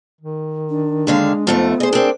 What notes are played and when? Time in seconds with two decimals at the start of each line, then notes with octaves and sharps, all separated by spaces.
0.21 D#3
0.69 D4
1.07 D#2 D3 G#3 F5
1.47 F2 G#2 A3 B3
1.80 G#4 C5 D#5
1.93 C4 D4 A#4